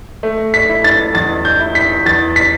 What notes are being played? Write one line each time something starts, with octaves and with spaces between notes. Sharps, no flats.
A3
B6
E4
A6
E2 A6
G6
E4
B6
E2 A6
B6